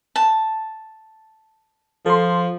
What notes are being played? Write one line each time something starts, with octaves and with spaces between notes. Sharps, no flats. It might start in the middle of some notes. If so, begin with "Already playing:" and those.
A5
F3 A4 C6